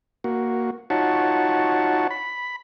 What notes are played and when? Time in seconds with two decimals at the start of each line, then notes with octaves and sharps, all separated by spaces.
0.24 A#3 F#4
0.90 D#4 F4 F#4 C#5 F#5 A5
2.10 B5